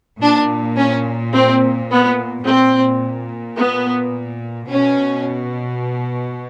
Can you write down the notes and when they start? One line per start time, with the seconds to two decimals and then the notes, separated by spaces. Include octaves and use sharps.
0.22 A#2 D4
0.77 C#4
1.33 C4
1.90 B3
2.45 A#2 C4
3.57 B3
4.69 B2 C#4